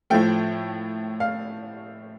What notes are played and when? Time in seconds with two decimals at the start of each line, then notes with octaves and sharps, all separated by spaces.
0.10 A2 F3 A3 G5
1.20 F5